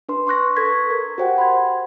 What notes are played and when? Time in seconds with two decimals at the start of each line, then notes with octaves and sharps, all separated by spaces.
0.09 D4 B4 C6
0.27 C6 C#6 F#6 A#6
0.56 A4 B4 C#6 G#6 B6
0.90 A#4
1.18 F#4 G4 C5 F#5 G5
1.38 B5 C6 G#6